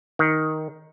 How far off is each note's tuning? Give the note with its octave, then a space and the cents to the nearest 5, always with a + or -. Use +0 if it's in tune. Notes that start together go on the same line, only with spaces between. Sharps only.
D#3 +5